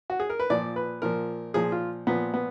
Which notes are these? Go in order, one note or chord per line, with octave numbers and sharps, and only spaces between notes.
F#4
G#4
A#4
B4
A#2 F3 D5
B4
A#2 F3 A#4
A#2 F3 G#4
F4
A#2 F3 B3
B3